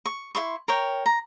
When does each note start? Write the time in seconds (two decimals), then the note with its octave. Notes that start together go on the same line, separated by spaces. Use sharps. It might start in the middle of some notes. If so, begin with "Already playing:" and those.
0.06 C#6
0.35 E4 C5 C6 C#6
0.68 A#4 C#5 G5
1.06 A#5